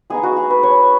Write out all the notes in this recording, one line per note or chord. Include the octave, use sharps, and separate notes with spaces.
G#3 B3 D#4 G#4
F#4
G#4
B4
C#5